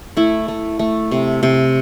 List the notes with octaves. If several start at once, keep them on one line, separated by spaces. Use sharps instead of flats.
A3 E4
A3
A3
C3
C3